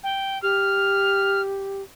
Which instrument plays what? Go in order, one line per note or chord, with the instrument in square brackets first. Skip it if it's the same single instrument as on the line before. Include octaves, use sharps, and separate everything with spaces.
[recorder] G5
[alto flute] G4 [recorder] F6